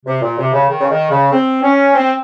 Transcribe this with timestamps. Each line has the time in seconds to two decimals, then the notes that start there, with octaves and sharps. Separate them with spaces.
0.06 C3
0.21 A#2
0.38 C3
0.52 C#3
0.68 D#3
0.79 C#3
0.90 D#3
1.10 C#3
1.31 C4
1.62 C#4
1.94 C4